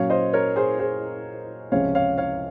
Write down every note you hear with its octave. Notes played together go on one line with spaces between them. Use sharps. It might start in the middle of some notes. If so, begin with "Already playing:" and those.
Already playing: A#2 F#3 C#4 C#5 F5
C5 D#5
A#4 C#5
G#4 C5
G#4 C5
C#2 C3 F3 G#3 C#4 C#5 F5
C#5 F5
C#5 F5